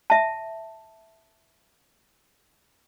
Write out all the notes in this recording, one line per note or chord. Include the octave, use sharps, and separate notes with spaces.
E5 A5